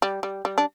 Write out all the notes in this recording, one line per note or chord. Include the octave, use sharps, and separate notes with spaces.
G3
G3
G3
D4